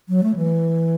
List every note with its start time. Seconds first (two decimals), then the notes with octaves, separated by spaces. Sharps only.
0.09 F#3
0.23 A3
0.36 E3